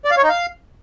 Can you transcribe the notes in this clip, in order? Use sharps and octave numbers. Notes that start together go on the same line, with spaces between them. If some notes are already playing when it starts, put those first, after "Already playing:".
D5
F5
C#5
D#4
F5